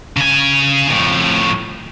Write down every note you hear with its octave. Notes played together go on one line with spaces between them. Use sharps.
C#3 G#5
F2 A2